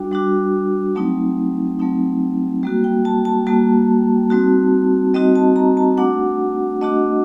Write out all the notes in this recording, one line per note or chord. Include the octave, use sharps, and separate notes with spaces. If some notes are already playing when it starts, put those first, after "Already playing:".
Already playing: G3 D4 F#4 G5
G3 D4 F#4
F#3 A3 C4 D#4
F#3 A3 C4 D#4
G3 A#3 F#4
G5
A5
A5
G3 A#3 F#4 A5
G3 C4 D#4 F#4
G3 C4 D#4 F#4 D#5
A5
A#5
A5
A3 D4 F#4 F#5
A3 D4 F#4 D#5